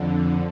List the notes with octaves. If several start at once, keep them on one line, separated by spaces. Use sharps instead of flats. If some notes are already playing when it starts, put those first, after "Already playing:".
Already playing: F2 D3